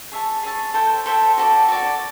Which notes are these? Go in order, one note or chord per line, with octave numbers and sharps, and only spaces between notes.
G#4 C#5 E5 A5
G#4 C#5 E5 A5
A4 C5 E5 G5
A4 C5 E5 G5
F#4 A4 D5
F#4 A4 D5